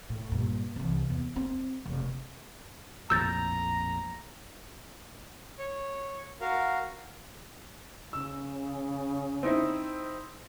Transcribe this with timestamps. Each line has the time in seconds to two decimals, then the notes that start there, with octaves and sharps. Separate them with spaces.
0.09 A2
0.32 G2 A#2
0.76 C2 E3
1.10 E2
1.36 C4
1.86 F1
3.10 A#1 F2 A2 A#5 E6 G6 A6
5.59 C#5
6.41 F#4 A#4 F5
8.13 C#3 E6
9.43 C4 D#4 E4